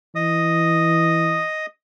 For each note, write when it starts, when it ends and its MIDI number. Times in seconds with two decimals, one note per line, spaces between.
0.15 1.42 52
0.15 1.66 75
0.15 1.66 87